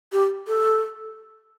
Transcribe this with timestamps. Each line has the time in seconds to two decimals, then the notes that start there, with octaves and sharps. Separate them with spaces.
0.13 G4
0.48 A4